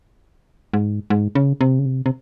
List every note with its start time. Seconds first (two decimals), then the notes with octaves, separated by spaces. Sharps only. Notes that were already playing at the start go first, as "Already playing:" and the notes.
0.73 G#2
1.10 G#2
1.35 C#3
1.61 C3
1.79 C#3
1.85 C3
2.06 C3